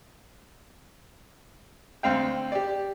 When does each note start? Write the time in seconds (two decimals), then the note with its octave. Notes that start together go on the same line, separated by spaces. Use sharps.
2.03 D2 C4 F5 G5
2.52 G4 D5